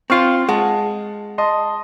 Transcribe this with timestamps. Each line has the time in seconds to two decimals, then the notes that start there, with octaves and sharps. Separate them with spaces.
0.10 C4 F4 C#6 F6 C7
0.49 G#3 F#5 A5
1.38 D#5 A5 C6